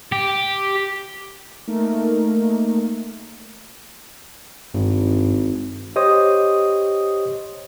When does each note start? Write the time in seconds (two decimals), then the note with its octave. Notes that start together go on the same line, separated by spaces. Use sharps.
0.12 G4
1.67 A3 A#3 D#4 A#4
4.74 G#1 G2
5.96 G4 C5 C#5 D#5 D#6